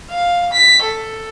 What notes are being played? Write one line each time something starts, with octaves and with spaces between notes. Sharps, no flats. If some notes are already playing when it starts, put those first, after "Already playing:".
F5
B6
A4